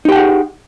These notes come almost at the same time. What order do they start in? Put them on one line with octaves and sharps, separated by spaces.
D#4 G4 G5 F#5 G#4